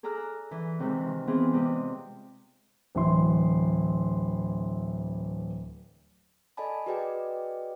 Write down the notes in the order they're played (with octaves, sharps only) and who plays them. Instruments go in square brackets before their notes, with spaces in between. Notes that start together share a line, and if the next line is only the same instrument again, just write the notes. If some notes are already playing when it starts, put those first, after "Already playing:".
[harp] G#4 A4 D5 A#5 F6 F#6
E3
C3 D#3 E3 G#3
D#3
E3 B3 C4 F4 G#4
C3 G#3 D5 D#5
[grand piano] D1 E3 C6
[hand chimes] A4 D5 D#5 G#5 A5 B5
F#4 G#4 B4 D5 D#5 G5